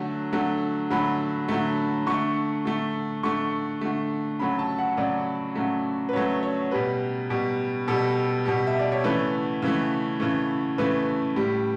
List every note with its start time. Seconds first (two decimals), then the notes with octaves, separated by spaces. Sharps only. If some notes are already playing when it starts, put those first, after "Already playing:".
Already playing: D3 F#3 A3
0.33 D3 F#3 A3
0.91 D3 F#3 A3 B5
1.49 D3 F#3 A3
2.07 D3 A3 C#6
2.65 D3 A3
3.23 D3 A3 C#6
3.81 D3 A3
4.39 C#3 F#3 A3 B5
4.59 A5
4.79 F#5
4.97 C#3 F#3 A3 D5
5.55 C#3 F#3 A3
6.09 B4
6.13 C#3 F#3 A3 C#5
6.43 C#5
6.71 B2 G3 B4
7.30 B2 G3
7.88 B2 G3 A4
8.45 B2 G3
8.67 E5
8.79 D5
8.92 C#5
9.04 C#3 E3 A3 B4
9.62 C#3 E3 A3
10.20 C#3 E3 A3
10.78 C#3 E3 A3 B4
11.36 A2 G3